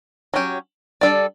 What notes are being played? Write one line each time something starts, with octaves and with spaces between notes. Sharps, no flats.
F#3 C#4 G4
G3 D4 A4 D5